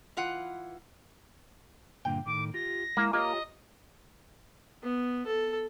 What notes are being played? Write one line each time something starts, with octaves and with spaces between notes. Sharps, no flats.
E3 F4 F#5
G2 A#2 D3 G5
A2 D#3 D6
F4 G4 A#6
G#3 A#3 E4
A#3 F4 G4 C#5 D#5
B3
A4